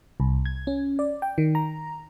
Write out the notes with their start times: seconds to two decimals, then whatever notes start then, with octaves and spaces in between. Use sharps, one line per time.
0.20 C2
0.45 G#6
0.67 C#4
0.99 D5
1.22 G5
1.38 D#3
1.55 A#5